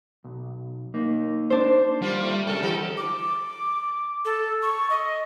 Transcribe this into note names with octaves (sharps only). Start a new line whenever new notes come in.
B1
A#3 D#4
D4 C5
G3 A#3 F4
A3
C3 A4 A#4
E3 D#4 G4
D6
A4
C#6
D#5